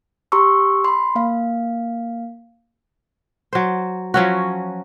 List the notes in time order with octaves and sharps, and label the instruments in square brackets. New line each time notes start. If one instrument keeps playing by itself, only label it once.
[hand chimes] G4 A#5 C6 C#6 E6
B5 C6
A#3 F5
[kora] F#3 C5
F3 F#3 C#4 F#4